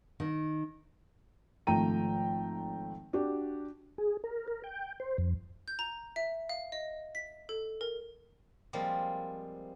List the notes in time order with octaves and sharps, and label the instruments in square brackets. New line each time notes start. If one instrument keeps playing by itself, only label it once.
[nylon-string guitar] D#3
[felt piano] G#1 F3 A3 G5 A#5 D#7
D4 F#4 G4
[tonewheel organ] G#4
A#4
A#4
G5
C5
F2
[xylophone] G6
A#5
E5
F5
D#5
B6
A4
A#4
[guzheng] F3 G3 G#3 A#3 C4